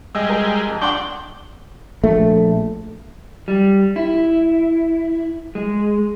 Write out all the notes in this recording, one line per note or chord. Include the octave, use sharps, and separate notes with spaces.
G3 G#3 D#5 E6
A#4 D#5
F2
D4 F#5 G5 C6 C#6
A#1 A3
G3
E4
G#3